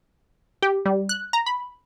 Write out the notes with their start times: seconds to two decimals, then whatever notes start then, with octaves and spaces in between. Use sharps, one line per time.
0.62 G4
0.86 G3
1.09 F#6
1.33 A#5
1.46 B5